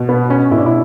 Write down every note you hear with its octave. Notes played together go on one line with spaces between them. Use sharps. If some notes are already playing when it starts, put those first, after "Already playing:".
Already playing: B2
B3
C#4
B2 E4
D4
E4